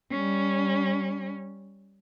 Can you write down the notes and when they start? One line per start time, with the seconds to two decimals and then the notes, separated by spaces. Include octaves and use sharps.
0.12 G3 C#4